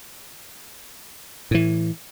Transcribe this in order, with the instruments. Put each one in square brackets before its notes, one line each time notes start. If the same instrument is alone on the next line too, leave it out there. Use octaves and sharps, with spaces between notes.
[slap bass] A2 E3